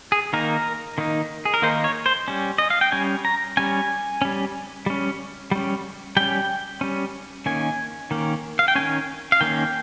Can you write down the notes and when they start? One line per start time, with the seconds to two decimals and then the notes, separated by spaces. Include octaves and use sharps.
0.12 G#4
0.33 D#3 A#3 D#4 A#4
0.98 D#3 A#3 D#4
1.45 G#4
1.54 A#4
1.62 D#3 A#3 D#4 C5
1.84 C#5
2.06 C5
2.28 G3 C#4
2.58 D#5
2.70 F5
2.81 G5
2.92 G3 C#4 G#5
3.25 A#5
3.57 G3 C#4 G#5
4.22 G3 C#4
4.86 G3 C#4
5.51 G3 C#4
6.17 G3 C#4 G5
6.81 G3 C#4
7.46 D#3 A#3 C#4 G#5
8.11 D#3 A#3 C#4
8.59 F5
8.68 G5
8.75 D#3 A#3 C#4 G#5
9.32 F5
9.41 D#3 A#3 C#4 G5